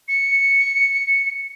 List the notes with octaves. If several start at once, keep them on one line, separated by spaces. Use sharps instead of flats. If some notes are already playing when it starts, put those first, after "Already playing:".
C#7